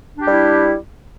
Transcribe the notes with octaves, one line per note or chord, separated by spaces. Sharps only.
G3 D4 E4 G4